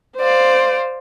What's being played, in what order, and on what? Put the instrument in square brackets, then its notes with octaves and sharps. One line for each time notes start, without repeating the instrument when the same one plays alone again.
[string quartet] C5 D5 F5